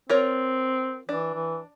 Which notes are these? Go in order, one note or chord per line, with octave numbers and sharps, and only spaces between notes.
C4 F4 A#4 C#5
E3 D4
E3